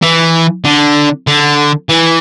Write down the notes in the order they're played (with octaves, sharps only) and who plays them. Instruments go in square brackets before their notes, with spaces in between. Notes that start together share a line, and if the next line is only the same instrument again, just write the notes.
[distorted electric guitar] E3
D3
D3
E3